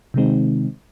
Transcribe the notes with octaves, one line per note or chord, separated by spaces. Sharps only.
C3 D#3 G#3 C4 D#4